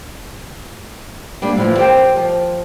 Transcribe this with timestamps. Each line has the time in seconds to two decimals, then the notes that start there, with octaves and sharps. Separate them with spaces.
1.42 G3 A#3 D4
1.56 A2 E3 F3
1.78 G4 A#4 C5 G5
2.16 F3